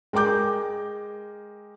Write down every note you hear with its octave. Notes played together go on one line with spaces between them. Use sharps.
G#3 A#4 G5 D6 G6